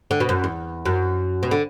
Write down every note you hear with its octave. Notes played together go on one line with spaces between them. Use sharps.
D3
B2
F#2
E2
F#2
B2
D3